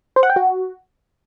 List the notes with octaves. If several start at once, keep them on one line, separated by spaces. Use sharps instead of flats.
C5
F#5
G5
F#4